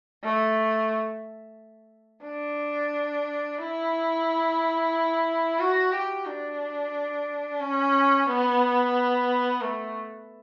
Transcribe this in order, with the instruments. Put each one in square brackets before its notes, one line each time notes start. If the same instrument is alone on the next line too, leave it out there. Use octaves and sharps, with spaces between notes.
[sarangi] A3
D4
E4
F#4
G4
D4
C#4
B3
A3